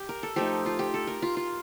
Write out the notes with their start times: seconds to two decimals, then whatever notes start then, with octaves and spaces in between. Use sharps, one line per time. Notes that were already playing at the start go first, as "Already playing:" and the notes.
Already playing: G4
0.09 A#4
0.23 A4
0.36 F3 A3 D#4 G4
0.66 F4
0.79 G4
0.94 A4
1.07 A#4
1.22 F4
1.37 F4